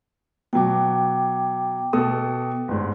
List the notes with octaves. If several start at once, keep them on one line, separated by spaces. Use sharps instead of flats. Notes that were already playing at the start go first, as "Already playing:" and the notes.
B2 F#3 G5 D6
B2 A4 D#6
G1 G#2